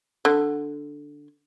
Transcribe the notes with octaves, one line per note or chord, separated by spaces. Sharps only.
D3